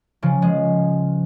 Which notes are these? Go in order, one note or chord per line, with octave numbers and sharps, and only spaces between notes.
C#3 F3
F3 G#3